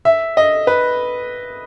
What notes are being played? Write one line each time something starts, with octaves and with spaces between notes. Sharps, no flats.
E5
D#5
B4